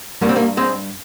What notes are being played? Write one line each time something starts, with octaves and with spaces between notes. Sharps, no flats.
G2 G3 A#3
C4
G3 A#3
G#3 C4